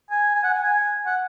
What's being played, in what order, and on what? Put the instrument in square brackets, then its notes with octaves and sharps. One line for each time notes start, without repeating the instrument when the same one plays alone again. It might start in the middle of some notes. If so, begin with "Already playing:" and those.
[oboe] G#5
G#5
F#5
G#5
G#5
F#5